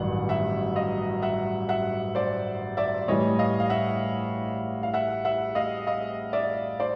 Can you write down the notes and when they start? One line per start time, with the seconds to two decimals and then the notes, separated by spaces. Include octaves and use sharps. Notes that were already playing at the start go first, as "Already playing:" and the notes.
Already playing: A1 G2 D#3 F#3 F#5
0.29 E5 F#5
0.76 D#5 F5
1.22 E5 F#5
1.69 E5 F#5
2.15 C5 D5
2.77 D5 E5
3.08 A2 E3 G3 C#5 D#5
3.39 D#5 F5
3.60 F5
3.70 E5 F#5
4.83 F5
4.94 E5 F#5
5.25 E5 F#5
5.55 D#5 F5
5.87 D#5 F5
6.33 D5 E5
6.80 C5 D5